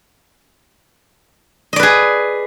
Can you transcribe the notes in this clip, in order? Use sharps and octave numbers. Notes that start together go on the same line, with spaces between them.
G#4 B4 D5 D#5